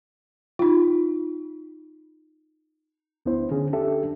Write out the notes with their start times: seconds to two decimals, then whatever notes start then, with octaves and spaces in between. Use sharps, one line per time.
0.59 D#4 F4
3.26 D2 B3 D4 E4 C5
3.51 D3 C#4 G#4
3.73 D4 G4 A4 E5